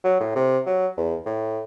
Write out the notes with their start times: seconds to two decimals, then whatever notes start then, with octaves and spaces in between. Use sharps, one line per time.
0.04 F#3
0.20 A2
0.35 C3
0.66 F#3
0.97 E2
1.26 A2